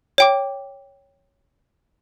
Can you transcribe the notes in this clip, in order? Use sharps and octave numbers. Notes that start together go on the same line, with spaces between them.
C#5 G5 D6